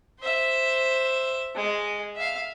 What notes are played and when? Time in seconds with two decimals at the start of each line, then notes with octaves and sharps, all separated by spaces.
0.20 C5 E5
1.55 G#3
2.15 E5 F5